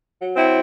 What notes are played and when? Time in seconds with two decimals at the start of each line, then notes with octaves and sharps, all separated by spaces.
0.21 F#3
0.35 C4 E4